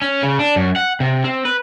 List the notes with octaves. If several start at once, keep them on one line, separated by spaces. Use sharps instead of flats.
C#4
C#3
D4
F#2
F#5
C3
C4
B4